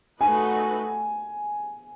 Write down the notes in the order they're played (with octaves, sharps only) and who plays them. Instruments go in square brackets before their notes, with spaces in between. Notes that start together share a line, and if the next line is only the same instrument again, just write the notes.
[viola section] A3 D#4 F#4 B4 [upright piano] G#5